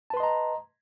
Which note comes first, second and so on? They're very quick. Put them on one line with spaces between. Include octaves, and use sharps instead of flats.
A5 B4 C6 D#5 A#5